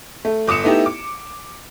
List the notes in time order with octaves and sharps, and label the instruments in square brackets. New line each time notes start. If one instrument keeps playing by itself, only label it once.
[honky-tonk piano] A3
G1 D6 D#6 C#7 E7
A3 B3 D#4 E4 G4
D6